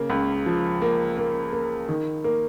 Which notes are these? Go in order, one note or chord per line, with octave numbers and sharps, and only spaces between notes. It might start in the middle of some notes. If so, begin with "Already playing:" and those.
Already playing: C#3 A#3
C#2
F3
A#3
A#3
A#3
D#3
A#3